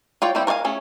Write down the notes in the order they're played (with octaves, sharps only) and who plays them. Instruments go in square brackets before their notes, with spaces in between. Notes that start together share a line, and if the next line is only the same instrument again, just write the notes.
[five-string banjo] F4 C#5 D5 G5
G3 C4 E4 G4
A#4 C#5 D5 F5 G#5
A3 C#4 G#4